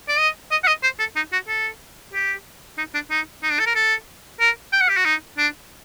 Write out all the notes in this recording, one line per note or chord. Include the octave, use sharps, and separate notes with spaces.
D5
D#5
D#5
F#5
D#5
C5
A4
D#4
F#4
A4
G4
D#4
D4
D#4
D#4
D4
A4
A#4
A4
A#4
G5
F#5
G4
F#4
D#4
D4